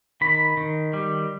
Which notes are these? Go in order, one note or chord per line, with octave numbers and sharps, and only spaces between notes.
D#3 B5
D#3
G3